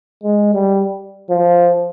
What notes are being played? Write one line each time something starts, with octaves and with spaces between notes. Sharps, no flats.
G#3
G3
F3